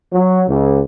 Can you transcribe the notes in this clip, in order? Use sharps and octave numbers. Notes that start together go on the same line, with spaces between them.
F#3
C#2